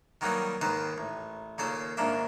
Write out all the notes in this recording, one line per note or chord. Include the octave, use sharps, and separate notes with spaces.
D#3 F#3 G3 A#3 B3 D#4
D#2 G#2 D#3 B4 C5
A1
D#2 A#2 C#3 A4 C5 C6
A#1 D#2 G#2 A#3 D4 E5